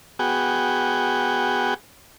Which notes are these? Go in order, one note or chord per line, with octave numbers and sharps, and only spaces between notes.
B3 F#4 G#4 G5